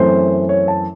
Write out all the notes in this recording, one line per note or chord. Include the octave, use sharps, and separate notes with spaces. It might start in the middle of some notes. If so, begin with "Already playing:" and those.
Already playing: F#2 E3 A3 C4 C5
C#5
A5